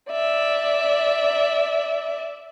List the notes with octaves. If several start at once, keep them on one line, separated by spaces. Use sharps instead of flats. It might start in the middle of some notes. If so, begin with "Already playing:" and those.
D5 E5